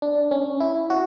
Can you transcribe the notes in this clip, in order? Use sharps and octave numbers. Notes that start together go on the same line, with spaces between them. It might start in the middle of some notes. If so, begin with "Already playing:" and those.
D4
C#4
E4
F#4